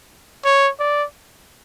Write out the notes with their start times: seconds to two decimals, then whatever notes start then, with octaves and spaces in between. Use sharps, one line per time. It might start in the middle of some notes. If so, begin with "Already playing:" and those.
0.45 C#5
0.80 D5